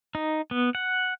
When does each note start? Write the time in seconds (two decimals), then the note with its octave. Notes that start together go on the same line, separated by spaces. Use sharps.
0.15 D#4
0.51 B3
0.75 F#5